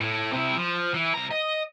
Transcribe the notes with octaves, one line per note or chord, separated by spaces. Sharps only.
A2
C3 E4
F3
E3
C2 A#5
D#5